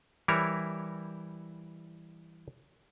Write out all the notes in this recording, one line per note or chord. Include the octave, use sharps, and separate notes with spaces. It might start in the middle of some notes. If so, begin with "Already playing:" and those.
E3 G3 E4 A#4 C#5